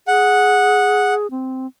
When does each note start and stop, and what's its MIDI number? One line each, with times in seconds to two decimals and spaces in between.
0.07 1.27 68
0.07 1.14 78
1.31 1.67 60